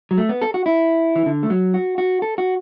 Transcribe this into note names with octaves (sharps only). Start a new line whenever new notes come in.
F#3
A3
B3
A4
F#4
E4
E3
D3
A3
F#3
F#4
F#4
A4
F#4